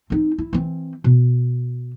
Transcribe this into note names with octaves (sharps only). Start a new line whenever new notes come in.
C4 D#4
E4
E3 C4
B2